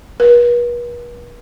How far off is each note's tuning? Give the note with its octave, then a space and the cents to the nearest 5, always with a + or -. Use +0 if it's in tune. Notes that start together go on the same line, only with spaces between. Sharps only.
B4 -45